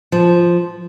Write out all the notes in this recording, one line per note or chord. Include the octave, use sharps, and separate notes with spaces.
F3